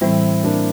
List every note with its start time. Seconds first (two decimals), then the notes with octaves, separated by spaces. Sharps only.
0.01 A2 E3 G3 C4 E4
0.44 A#3 D4